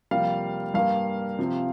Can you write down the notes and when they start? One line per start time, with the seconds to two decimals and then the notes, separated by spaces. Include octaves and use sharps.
0.11 F2 C3 G3 A#3 F5
0.74 G2 G3 A#3 F5
1.39 C3 F3 C4